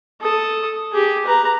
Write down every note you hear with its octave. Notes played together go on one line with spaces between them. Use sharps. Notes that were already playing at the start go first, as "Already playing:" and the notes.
A4 D#6
G4 G#4
B4 A#5